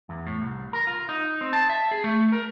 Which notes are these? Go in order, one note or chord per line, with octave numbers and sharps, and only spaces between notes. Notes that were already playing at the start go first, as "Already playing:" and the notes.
E2
A2
C2
A#4
F4
D#4
C4
A5
E5
G#4
A3
A#4